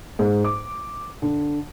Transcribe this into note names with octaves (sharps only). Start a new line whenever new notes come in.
G#2
D6
D3